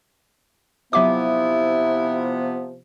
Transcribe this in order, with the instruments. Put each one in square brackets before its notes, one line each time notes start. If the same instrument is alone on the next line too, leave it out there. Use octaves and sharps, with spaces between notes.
[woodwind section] C3 F3 B3 [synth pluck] F#3 E5 D6 [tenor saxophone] E4